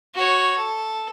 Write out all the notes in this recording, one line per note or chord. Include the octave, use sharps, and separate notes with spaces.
F#4 C#5
A4